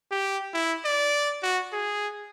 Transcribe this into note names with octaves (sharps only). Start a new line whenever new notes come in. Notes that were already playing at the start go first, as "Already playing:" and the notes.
G4
E4
D5
F#4
G#4